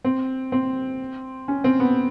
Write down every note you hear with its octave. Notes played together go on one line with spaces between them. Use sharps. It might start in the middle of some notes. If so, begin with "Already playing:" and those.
C4
C4
C#4
C4
B3